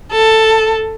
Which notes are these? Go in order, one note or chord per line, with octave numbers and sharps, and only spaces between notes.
A4